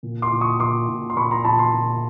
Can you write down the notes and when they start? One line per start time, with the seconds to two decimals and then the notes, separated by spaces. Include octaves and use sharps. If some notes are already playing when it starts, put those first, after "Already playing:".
0.03 A#2
0.22 C6 D6
0.32 A#2
0.41 C#6 D#6
0.59 A#2 C6 D6
0.88 A#2
1.10 C6
1.16 A#2 B5 C#6
1.31 A#5 C6
1.44 A#2 A5 B5
1.59 A#5 C6
1.73 A#2